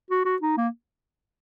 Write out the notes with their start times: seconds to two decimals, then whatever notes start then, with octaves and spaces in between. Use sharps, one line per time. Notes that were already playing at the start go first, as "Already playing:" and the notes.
0.10 F#4
0.25 F#4
0.42 D#4
0.57 A#3